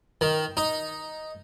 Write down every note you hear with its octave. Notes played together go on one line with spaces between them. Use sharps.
D#3
D#4